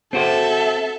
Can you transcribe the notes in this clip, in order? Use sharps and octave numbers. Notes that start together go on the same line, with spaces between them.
C4 F#4 A4 C5 E5